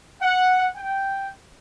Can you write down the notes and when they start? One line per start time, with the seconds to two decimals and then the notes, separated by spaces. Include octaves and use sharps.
0.22 F#5
0.76 G5